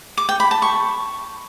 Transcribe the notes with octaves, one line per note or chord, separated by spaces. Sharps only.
D6
G5
B5
A5
C#6